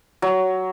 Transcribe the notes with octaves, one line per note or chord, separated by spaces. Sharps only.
F#3